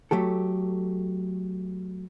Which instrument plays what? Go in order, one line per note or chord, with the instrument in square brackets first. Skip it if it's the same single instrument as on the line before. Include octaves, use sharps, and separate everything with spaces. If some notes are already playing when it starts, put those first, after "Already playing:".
[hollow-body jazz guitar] F#3 A3 G4 A4